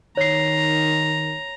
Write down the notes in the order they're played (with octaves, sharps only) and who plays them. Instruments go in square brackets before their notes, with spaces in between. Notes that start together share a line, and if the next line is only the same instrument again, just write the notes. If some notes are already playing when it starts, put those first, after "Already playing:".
[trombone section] D#3 [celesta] C#5 C7 [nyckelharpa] A#5